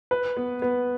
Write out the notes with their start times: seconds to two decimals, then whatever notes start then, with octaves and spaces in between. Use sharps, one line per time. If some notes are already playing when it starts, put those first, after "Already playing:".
0.11 B4
0.37 B3
0.62 B3